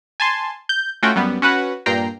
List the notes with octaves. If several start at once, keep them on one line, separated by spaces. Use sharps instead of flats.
G#5 A5 C6
G6
A3 C#4 F4 F#4 G5
F#2 G3 B3
C#4 F#4 B4 F#5
G2 A#2 G5 A#5 C7